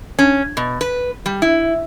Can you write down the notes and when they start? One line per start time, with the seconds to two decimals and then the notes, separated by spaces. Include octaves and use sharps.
0.19 C#4
0.57 B2
0.81 B4
1.26 G3
1.42 E4